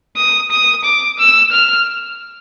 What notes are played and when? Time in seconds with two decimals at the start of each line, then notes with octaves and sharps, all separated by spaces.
0.17 D#6
0.51 D#6
0.84 D6
1.19 E6
1.52 F6